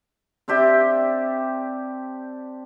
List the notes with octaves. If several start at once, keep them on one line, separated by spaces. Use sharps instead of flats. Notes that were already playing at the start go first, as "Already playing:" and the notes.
C4 D4 G4 E5